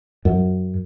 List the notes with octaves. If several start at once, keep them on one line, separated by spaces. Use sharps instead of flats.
F#2